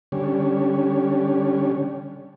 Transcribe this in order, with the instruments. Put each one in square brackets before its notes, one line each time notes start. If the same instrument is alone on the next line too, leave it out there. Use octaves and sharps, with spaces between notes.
[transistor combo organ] D3 G3 C#4